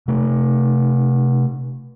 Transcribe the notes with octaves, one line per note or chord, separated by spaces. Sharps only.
C3 A3